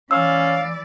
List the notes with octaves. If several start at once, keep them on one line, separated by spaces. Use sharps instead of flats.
E3 C#4 D5 F5 E6